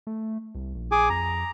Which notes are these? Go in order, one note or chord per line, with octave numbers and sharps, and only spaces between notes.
A3
C2
A#1
G#4 G#5 D6
F2 A#5